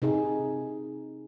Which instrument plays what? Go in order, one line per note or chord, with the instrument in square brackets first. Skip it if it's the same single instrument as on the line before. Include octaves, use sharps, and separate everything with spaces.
[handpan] C3 D#4 G#4